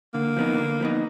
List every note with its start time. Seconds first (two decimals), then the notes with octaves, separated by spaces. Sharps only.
0.14 D3 A#3
0.37 F3 B3 D#4
0.58 D3
0.80 F3 B3 D#4